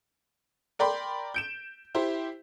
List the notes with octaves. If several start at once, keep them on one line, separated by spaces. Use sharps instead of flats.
A#4 D5 G5 B5 C6
G6 D7 E7
E4 G4 C5